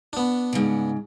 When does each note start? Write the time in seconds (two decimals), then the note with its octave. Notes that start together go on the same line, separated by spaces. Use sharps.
0.13 B3 D4
0.53 G#2 C#3